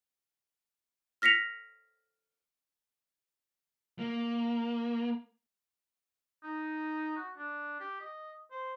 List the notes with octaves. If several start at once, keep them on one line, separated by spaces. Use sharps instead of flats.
F6 A#6 B6 C#7 F7
A#3
D#4
F#4
D4
G4
D#5
C5